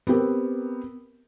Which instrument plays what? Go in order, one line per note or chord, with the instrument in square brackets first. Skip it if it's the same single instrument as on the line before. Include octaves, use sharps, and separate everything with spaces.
[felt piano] B3 C4 G4 A#4